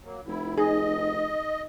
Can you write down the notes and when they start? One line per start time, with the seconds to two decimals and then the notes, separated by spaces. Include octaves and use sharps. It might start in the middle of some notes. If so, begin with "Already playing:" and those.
0.04 F#3 A#3
0.27 F1 E4
0.58 D#4 G#4 D#5